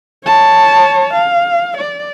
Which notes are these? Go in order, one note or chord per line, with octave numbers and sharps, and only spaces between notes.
C#5 A5
F5
D5